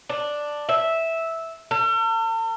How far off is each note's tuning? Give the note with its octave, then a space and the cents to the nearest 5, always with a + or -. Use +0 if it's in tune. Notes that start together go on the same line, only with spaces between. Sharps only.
D4 +5
E5 -10
A4 +45